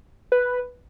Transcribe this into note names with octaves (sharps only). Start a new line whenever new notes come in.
B4